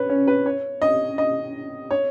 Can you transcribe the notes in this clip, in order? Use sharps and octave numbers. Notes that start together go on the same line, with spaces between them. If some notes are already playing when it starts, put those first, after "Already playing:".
Already playing: B4 C#5
C#4
B4
C#5
D#5
D#5
C#5